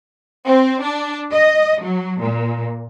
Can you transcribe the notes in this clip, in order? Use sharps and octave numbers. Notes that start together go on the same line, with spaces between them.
C4
D4
D#5
F#3
A#2